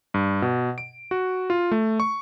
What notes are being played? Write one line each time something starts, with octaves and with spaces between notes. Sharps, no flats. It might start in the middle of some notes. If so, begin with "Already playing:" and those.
G2
B2
D7
F#4
F4
A3
C#6